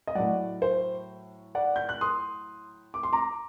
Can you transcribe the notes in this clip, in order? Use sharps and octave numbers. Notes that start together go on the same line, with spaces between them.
D#5
A2 F#3 D5 F#5
C5
D5 F#5
G6
F#6
C6 D#6
D6
C6
A#5 D6